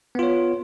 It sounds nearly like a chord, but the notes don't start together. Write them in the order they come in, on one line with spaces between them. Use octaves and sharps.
B3 F4 C#5